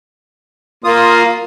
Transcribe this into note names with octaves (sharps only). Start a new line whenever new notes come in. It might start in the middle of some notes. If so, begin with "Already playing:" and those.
A#3 F4 D#6